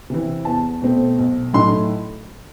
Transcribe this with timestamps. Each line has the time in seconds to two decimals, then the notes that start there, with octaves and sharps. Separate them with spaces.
0.10 C3 E3
0.45 E2 A5
0.82 B2 A3 C4
1.18 B1
1.53 A2 F#3 A3 D#4 C6